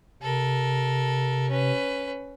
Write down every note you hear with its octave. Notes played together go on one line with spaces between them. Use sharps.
C3 A4 A#4
C#4 B4